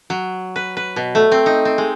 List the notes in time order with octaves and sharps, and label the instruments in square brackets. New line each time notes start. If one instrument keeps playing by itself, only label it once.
[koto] F#3
B4
B4
B2
A3
C4
D#4
C4
G#3